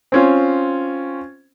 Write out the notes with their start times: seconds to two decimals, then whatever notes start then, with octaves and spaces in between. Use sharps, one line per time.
0.12 C4 C#4 F4